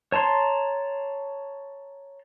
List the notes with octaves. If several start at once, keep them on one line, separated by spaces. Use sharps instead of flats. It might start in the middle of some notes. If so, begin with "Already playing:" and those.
C#5 A5 A#5 C6